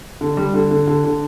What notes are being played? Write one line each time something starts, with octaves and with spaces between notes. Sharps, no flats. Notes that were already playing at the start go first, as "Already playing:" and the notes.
D3
G3
D3
D3
D3
D3